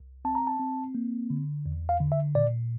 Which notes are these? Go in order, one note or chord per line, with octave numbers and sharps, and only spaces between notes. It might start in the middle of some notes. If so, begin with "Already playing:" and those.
Already playing: C2
C4 A5
A#5
A5
C4
A#3
D3
E2
F5
D3
E5
A#2 D5